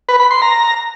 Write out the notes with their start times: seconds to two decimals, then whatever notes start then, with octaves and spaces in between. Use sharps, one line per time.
0.09 B4
0.20 B5
0.31 C6
0.42 A#5